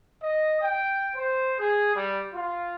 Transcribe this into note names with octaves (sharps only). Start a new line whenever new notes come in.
D#5
G5
C5
G#4
G3
F4